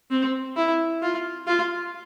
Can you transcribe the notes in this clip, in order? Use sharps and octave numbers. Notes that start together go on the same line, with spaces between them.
C4
E4
F4
F4